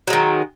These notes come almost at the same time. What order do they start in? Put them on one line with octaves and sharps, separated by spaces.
F#3 G#3 D#3